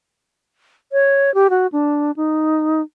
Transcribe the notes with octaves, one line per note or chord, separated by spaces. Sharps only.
C#5
G4
F#4
D4
D#4